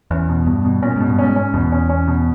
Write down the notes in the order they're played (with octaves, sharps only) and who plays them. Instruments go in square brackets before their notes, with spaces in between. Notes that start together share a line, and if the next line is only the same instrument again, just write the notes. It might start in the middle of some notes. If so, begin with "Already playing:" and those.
[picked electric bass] E2 [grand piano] C#4
[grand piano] B2
[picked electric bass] G2 [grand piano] B2
[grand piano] B2
[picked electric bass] A#2 [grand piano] C#4
[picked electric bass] G#2 [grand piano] B2
[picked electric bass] G2
[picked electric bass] G#2 [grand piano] C#4
[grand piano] C#4
[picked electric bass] E2 [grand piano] B2
[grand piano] C#4
C#4
B2